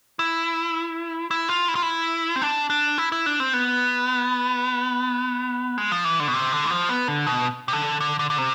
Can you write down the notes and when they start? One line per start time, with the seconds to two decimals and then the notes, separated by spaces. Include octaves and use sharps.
0.19 E4
1.31 E4
1.49 F4
1.68 E4
1.75 F4
1.82 E4
2.36 C4
2.42 D4
2.70 D4
2.98 E4
3.12 E4
3.26 D4
3.40 C4
3.53 B3
5.78 G#3
5.92 F3
6.05 E3
6.20 D3
6.28 B2
6.34 C3
6.52 D3
6.65 E3
6.71 F3
6.89 B3
7.08 D3
7.27 B2
7.68 C3
7.73 D3
8.00 D3
8.19 D3
8.30 D3
8.38 C3